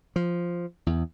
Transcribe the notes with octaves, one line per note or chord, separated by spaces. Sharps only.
F3
E2